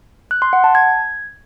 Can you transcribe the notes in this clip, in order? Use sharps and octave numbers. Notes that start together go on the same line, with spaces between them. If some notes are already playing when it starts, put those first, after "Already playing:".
F#6
C6
F#5
A5
G#6